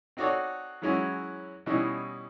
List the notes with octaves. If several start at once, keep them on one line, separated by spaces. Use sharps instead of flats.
C4 D#4 F#4 A4 C#5 D5
E3 F#3 G#3 C#4 E4 F#4
B2 E3 G3 C#4 D#4 E4